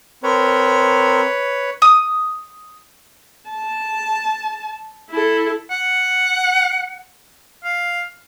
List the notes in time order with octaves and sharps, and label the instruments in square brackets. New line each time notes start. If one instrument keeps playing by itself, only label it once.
[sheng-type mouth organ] C4 A#4 [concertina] B4 C#5
[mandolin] D#6
[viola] A5
E4 A4
[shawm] F#5
F5